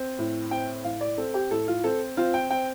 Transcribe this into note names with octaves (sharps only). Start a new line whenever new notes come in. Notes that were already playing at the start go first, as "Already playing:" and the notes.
Already playing: C4
A2
C4 G5
A2 F5
D5
C4 A4
G4
A2 A4
F4
C4 A4
C4 F4
G5
C4 G5